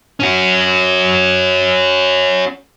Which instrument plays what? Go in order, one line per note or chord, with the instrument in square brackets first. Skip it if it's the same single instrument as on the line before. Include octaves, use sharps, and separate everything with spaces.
[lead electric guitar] C#4 F#4